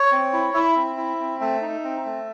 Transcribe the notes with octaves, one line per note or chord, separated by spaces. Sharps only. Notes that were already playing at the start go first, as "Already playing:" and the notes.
Already playing: C#5
C4
E4
E4 E5
C4
E4
C4
A3 E5
D#4
C4
A3